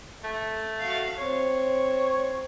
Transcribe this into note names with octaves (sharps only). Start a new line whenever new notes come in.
A3
F#4 F5
C4 C#5